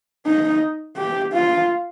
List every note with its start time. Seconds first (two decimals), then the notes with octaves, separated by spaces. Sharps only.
0.26 D#4
0.97 G4
1.33 F4